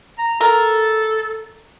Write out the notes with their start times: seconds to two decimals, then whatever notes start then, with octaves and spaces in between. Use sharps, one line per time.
0.18 A#5
0.41 A4 A#4